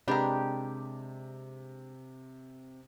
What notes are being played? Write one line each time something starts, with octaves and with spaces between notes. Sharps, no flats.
C3 G#3 D4 G4 A#4 B4